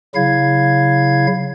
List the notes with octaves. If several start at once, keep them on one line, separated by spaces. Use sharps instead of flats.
C#3 F#3 E4 F5 G#6